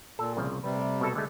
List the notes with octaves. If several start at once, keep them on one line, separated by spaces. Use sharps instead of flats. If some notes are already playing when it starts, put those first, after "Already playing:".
A#2 A4
C2 C#3 F3
C3 G3 B4
A3
B2 A4
D3 G#3 A3